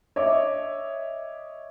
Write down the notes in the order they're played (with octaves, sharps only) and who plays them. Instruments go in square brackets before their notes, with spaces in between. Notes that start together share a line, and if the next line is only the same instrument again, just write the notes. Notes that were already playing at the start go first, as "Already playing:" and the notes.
[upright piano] C#5 D#5 E5 D6